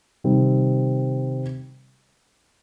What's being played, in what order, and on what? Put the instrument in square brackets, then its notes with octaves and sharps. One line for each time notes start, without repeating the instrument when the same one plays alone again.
[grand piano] C3 D#3 G3 C4